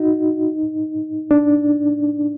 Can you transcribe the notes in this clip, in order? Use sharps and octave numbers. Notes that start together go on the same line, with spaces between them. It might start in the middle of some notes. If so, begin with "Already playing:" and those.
Already playing: D#4 F#4
D4